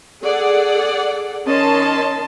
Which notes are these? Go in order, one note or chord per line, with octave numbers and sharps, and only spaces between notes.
G#4 A4 D5 F#5
D#3 C#4 D#5 A5 C6